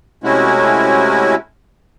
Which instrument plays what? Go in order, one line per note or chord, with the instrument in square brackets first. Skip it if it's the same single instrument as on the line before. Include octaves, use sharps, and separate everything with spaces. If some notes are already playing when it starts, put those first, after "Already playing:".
[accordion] C3 G#3 A3 C#4 E4 F#4